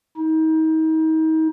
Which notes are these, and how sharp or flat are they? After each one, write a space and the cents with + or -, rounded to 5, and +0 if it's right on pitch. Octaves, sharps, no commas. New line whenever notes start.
D#4 +35